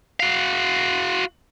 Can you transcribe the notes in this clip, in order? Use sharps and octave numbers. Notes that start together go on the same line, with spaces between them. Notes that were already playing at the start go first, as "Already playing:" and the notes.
F#4 F5